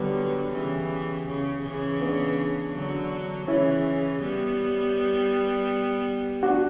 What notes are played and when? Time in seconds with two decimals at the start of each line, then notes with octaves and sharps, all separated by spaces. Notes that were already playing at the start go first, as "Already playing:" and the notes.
Already playing: D3 F#3 G3 B3
0.53 C#3 E3
1.26 C#3
1.63 C#3 E3
2.01 B3 D4
2.74 D3 F#3
3.47 C#3 E3 C#4 E4
4.22 G3 B3
6.43 D4 F#4